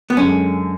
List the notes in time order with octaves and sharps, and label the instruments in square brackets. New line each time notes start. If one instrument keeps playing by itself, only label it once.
[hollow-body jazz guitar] B3
[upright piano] F#2 D3 G#3 [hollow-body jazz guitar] C#4